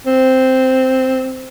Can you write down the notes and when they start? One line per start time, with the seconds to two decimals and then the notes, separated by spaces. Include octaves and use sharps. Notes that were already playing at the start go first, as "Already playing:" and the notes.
0.06 C4